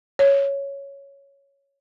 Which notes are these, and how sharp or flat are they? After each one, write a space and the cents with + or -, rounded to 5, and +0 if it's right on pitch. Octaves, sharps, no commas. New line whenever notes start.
C#5 +5